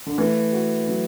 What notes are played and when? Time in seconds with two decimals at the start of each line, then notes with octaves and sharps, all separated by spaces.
0.07 D3
0.18 E3 A3
0.53 F#4
0.88 F#3